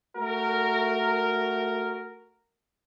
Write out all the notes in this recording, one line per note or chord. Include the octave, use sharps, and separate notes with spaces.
A3 F#4 A#4